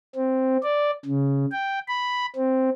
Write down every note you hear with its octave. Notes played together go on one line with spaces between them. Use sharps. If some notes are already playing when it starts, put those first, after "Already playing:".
C4
D5
C#3
G5
B5
C4